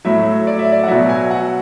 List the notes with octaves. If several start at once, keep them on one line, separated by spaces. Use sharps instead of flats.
A2 F#3 E5
D5
E5
D5
F#5
B2 F#3 E5
G#5
F#5